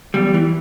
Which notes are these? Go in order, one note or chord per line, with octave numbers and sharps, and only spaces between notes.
E2 G3
E3